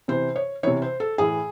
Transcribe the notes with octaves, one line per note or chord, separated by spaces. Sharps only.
C3 E3 C5
C#5
C3 E3 C#5
C5
A4
A2 E3 G#4